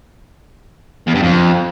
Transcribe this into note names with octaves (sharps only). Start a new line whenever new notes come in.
E2
G2
F2